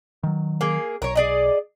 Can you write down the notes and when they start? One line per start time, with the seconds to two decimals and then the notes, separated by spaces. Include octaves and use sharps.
0.23 D#3 F#3
0.61 A#3 G#4
1.02 B1 A#4 C#5
1.16 G#4 D5 D#5